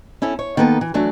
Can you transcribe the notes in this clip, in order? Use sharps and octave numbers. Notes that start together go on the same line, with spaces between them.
C#4 E4 A4
C#5
D#3 A#3 B3 A4 B4
E3
E3 F#3 A3 D4